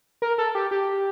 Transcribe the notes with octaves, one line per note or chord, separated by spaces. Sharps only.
A#4
A4
G4
G4